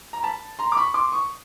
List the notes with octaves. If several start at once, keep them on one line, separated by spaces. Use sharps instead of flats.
A#5
A5 B5
A#5 C6
D6
B5 C#6
C6 D6
C#6 D#6